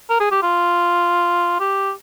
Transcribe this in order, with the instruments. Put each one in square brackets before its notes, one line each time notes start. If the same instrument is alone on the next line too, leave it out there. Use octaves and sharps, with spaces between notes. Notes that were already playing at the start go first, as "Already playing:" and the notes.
[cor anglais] A#4
G#4
G4
F4
G4